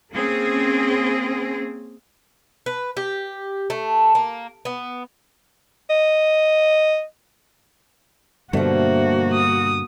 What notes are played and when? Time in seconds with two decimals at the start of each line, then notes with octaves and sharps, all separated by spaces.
0.12 A#3 C4 C#4 G#4
2.66 B4
2.97 G4
3.70 A3
4.15 A#3
4.65 B3
5.90 D#5
8.53 G2 B2 D3 F3 A3 A#3 F#4
9.34 D#6